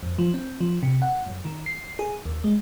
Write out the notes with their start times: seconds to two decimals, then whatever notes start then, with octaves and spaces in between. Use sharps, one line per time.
0.03 F2
0.18 F3
0.34 C4
0.60 F3
0.83 C3
1.02 F#5
1.26 F#2
1.45 D#3
1.66 C7
1.99 G#4
2.25 D#2
2.44 G#3